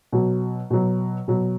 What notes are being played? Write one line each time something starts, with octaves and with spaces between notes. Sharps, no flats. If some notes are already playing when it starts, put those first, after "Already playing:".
B2 F#3
B2 F#3
B2 F#3